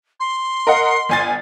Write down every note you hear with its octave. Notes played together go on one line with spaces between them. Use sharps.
C6
A#4 D#5 F#5
G1 G#5 A6